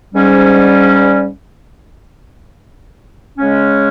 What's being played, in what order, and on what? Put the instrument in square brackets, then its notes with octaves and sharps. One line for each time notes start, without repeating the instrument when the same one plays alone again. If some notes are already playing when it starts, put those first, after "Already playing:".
[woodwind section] G#2 G3 C#4
C#3 G#3 C#4